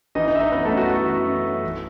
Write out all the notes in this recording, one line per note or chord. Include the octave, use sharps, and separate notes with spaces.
E3 D#4 D#5
D#4 D#5
E3 E5
D#4 D#5
F#2 B3 B4
A3 A4
F#2
F#4
E3 F#4
E3
F#2
F#2
E3